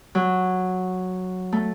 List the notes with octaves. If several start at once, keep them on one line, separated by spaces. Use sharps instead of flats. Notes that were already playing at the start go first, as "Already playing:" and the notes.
F#3
A3